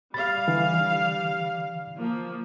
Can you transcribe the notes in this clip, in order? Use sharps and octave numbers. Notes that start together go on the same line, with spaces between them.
G3 F5 B5 A6
D3 E3
F3 A#3